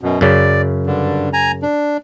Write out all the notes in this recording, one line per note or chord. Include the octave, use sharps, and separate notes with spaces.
F#2 B2
F#2 C#3 D5
G2 D3
G#5 A#5
D4